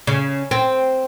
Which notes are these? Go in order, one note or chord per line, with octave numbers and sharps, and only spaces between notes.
C#3
C4